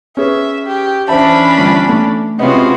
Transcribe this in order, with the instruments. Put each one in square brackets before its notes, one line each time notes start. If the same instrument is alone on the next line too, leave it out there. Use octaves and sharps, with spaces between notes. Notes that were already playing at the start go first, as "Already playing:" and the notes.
[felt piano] C#4 G#4 B4 [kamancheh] E5
[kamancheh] G4
[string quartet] E3 C#4 D4 [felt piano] C5 E5 A5 [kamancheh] B5
[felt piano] G1
A3
[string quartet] C3 G#3 F#4 [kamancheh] B3 F4 [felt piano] C#4 D#5